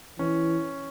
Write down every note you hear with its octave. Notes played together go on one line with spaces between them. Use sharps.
E3 C#4